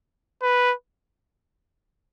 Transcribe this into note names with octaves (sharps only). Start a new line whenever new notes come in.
B4